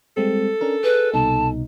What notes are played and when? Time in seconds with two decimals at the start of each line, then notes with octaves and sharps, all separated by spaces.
0.17 G3 G#3 C4 A4
0.61 C#4 D4 A#4
0.84 G#4 B4
1.13 C2 B2 D#4 A5